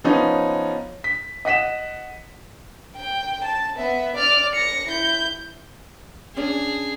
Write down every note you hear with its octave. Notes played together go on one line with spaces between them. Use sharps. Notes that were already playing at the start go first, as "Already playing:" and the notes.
F3 B3 C#4 D#4
B6
D#5 F#5 B6 E7
G5
A5
B3 E5
D5 F6
A#6 C#7
E4 G6
C#4 D4 G#4